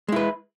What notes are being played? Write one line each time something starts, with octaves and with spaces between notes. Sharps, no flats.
G#3 E4 B4